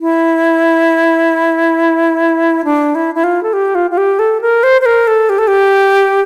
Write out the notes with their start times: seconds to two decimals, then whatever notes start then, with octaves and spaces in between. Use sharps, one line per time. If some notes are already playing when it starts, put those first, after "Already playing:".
0.01 E4
2.65 D4
2.95 E4
3.15 E4
3.24 F4
3.43 A4
3.53 G4
3.75 F4
3.91 F4
3.98 G4
4.19 A4
4.41 A#4
4.63 C5
4.81 C5
4.86 A#4
5.07 A4
5.29 G4
5.38 A4
5.47 G4